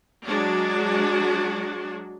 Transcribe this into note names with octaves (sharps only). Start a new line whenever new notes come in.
F#3 G#3 D4 F#4